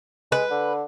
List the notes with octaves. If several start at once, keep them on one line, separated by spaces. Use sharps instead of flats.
G#3 B4
D3